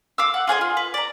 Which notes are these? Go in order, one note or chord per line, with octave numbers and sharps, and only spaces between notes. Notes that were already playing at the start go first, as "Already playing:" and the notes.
F5 D6 E6
F#5
F4 G#4 C#5 D#5
F4
B4
D5 A#5